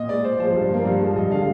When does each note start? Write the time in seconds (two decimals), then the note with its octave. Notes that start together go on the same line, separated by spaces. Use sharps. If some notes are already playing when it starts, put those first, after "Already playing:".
Already playing: A#2 D#5
0.09 G#3 D5
0.24 A#2 C5
0.40 F3 G#3 C5
0.54 G2
0.71 F3 A#3
0.85 G2
1.01 F3 G#3
1.16 G2 D#5
1.31 D3 G#3 F5